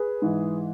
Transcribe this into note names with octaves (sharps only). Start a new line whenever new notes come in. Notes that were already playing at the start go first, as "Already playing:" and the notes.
Already playing: G#4 B4
G#2 E3